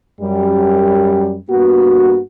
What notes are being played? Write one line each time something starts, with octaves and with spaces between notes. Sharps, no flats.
F#2 G3
G2 A#3 B3 F#4